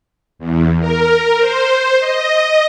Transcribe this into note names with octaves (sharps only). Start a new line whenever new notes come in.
E2
A#4
C5
D#5